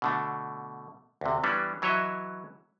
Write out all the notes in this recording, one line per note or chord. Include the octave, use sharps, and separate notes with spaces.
B2 D3 A3
D2 C3
E3 G3 B3 C#4 D4
E3 F#3 C#5 D#5 E5